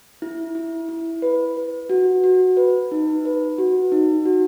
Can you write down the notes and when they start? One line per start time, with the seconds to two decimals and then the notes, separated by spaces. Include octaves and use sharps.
0.22 E4
0.55 E4
0.89 E4
1.22 B4
1.57 B4
1.90 F#4
2.24 F#4
2.57 B4
2.92 D#4
3.25 B4
3.58 F#4
3.92 D#4
4.25 F#4